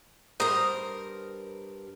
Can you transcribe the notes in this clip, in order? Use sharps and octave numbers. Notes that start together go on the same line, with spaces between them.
G2 A#4 C5 A#5 D#6